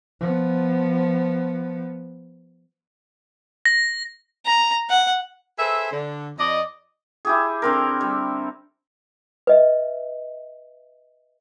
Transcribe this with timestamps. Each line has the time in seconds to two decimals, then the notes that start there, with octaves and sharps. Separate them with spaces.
0.20 F3 B3
3.66 A#6
4.46 A#5
4.90 F#5
5.59 G#4 A4 B4 C5 E5
5.91 D3
6.38 F2 D5 D#5
7.25 E4 G4 G#4
7.62 D3 C4 A#4
8.01 G3
9.47 B4 D#5 E5